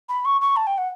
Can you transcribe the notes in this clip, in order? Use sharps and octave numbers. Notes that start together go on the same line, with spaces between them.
B5
C#6
C#6
A5
G5
F#5